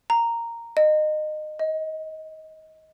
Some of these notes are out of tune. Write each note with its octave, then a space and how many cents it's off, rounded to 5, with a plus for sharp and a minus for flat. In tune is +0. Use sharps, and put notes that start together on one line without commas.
A#5 -5
D#5 -25
D#5 +20